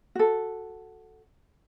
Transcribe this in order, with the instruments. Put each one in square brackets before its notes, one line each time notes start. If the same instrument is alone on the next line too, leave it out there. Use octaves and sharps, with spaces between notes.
[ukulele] F#4 A4